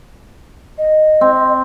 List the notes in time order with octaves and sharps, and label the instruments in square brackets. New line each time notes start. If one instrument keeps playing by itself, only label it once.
[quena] D#5
[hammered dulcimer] C4